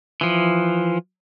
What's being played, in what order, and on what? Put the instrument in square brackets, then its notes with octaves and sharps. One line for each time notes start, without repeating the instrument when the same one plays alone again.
[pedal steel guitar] E3 F3